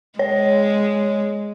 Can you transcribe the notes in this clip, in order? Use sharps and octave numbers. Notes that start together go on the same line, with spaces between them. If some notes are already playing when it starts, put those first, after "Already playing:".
G#3 C#5